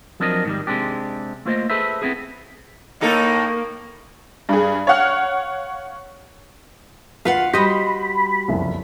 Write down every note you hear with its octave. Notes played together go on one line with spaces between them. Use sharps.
F3 F#3 C4 D4 A#4 D#5
G#2 D#3 G3
C3 G#3 C4 D4 G4
A3 A#3 F4 C5 D5 D#5
G#4 A4 B4 C5 E5
B3 C4 E4 G#4
A2 A#3 D#4 A4
G2 G#4
C#5 F5 F#5 F6
D2 F4 B4 F5 F#5
G3 F#4 G4 C5 D#5 B5
F#1 C2 F2